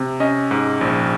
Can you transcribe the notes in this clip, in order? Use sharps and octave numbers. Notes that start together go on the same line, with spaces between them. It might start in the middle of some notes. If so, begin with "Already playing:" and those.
Already playing: C3
C#4 D#5
G#2
A#1